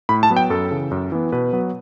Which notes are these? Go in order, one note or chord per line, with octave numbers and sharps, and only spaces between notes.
A2 B5
A5
F#3 B3
G5
F#2 A4
C#3 E3
F#2
E3 B3
B2 B4
F#3 B3